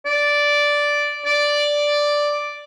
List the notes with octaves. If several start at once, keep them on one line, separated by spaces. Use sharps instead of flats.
D5
D5